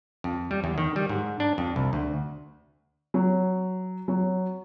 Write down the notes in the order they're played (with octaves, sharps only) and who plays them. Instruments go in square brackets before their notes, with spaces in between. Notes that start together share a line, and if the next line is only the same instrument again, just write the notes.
[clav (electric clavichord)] F2
G3
E2
D#3
G3
G#2
D4
F2
C2
D2
[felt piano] F#3
F#3